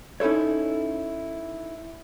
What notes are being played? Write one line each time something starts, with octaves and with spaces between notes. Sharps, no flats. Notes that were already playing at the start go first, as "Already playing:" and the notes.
C#4 D#4 E4 A4 C#5